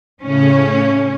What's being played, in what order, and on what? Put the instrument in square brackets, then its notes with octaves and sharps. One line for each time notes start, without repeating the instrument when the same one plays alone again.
[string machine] A2 C#3 [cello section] C#4